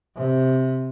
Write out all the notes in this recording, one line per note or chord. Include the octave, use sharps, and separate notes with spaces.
C3